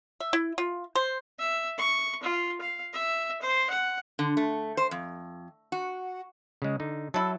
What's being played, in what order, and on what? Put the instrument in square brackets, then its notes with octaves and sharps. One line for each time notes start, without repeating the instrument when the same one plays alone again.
[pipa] E5
E4
F4
C5
[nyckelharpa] E5
C#6
F4
F5
E5
C5
F#5
[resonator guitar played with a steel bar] D3
A3
C5
F2
F#4
[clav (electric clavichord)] C#3 G#3
D3 D#4
[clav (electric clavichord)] F#3 [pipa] E4 A4